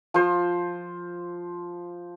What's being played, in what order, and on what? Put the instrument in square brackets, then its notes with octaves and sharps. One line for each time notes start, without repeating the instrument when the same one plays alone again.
[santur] F3 C5